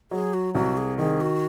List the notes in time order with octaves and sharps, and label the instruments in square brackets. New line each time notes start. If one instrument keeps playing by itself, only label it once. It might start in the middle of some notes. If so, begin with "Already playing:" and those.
[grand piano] F#3 [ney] G#4
[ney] F#4
[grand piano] C2 [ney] F#4
[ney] G#4
[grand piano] D#3 [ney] G#4
[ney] F#4